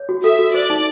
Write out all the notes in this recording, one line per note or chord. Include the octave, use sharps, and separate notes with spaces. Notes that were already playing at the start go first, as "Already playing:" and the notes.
Already playing: C#5
F#4
A4 E5
F#4
C5 D5
D#4